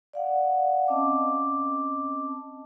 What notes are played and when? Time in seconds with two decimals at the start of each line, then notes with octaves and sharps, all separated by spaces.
0.13 D5 F5 F#5
0.88 C4 C#4 D#5 A5 D6